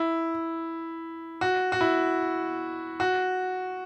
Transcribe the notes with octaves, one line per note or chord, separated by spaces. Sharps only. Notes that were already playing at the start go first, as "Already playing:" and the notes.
Already playing: E4
F#4
F#4
E4
F#4